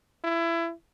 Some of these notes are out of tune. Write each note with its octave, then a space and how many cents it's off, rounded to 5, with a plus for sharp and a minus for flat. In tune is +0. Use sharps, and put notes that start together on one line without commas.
E4 +25